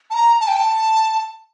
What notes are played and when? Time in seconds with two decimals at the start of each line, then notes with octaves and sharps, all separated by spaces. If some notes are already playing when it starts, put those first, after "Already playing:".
0.10 A5
0.14 A#5
0.40 A5
0.48 G5
0.57 A5